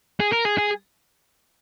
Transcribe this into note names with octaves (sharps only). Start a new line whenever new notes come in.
G#4
A#4
G#4
G#4